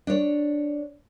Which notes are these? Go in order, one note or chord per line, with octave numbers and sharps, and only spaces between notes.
D4 C#5